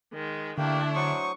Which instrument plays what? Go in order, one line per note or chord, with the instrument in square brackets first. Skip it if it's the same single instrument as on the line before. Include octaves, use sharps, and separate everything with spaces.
[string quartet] D#3 G#3
[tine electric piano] D3 [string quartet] A3 D4 E4 [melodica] A#3 G4
[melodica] F#3 C5 D#6 [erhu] C#6